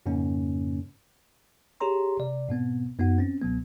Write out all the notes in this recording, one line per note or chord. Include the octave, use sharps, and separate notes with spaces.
F2 G#2 C#3 A#3 C#4
G4 G#4 C#5 A#5 C6
C3 D5
G#2 B2 B3 C4
F#2 B3 D#4 F#4 F#5
C4 C#4
C#2 B2 F#3 B3